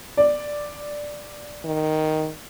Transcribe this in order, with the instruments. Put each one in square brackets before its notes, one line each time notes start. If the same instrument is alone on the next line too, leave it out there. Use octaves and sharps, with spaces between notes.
[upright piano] D5
[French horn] D#3